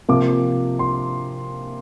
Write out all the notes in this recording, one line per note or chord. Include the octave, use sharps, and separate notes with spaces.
C3 F3 A#3 D6
C6